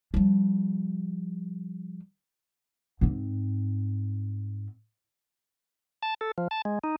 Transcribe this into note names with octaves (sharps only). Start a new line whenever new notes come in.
F3 G3
G#2 C4
A5
A4
F3
A5
G#3
D#4